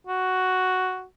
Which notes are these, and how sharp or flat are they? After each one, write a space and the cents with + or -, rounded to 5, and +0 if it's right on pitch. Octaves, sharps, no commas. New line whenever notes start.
F#4 +5